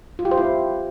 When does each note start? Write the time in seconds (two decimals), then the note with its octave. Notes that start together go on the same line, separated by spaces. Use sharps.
0.19 F4
0.25 G4
0.31 C5
0.38 E4